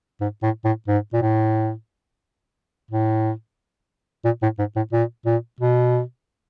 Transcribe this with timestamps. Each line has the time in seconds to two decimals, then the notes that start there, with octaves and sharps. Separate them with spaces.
0.21 G#2
0.43 A2
0.65 A2
0.88 G#2
1.13 A#2
1.22 A2
2.91 A2
4.25 A#2
4.43 A2
4.59 G#2
4.76 A2
4.93 A#2
5.26 A#2
5.60 B2